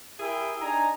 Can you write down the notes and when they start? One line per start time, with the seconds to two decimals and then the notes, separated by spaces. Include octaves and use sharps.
0.19 E4 G4 G#4 A#4 E5 G5
0.59 D4 D#4 G#4 G#5 A#5